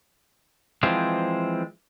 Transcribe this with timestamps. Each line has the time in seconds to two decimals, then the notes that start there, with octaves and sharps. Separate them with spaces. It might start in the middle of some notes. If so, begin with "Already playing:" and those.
0.83 E3 F3 G#3 C4